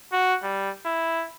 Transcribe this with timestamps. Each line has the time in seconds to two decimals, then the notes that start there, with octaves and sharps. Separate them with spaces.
0.12 F#4
0.43 G3
0.85 E4